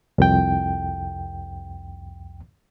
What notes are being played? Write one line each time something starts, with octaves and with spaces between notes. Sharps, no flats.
C2 F2 G5